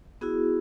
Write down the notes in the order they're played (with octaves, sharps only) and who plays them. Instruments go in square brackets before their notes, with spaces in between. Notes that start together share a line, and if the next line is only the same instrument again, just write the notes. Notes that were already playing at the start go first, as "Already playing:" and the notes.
[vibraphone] B3 E4 F#4 G#4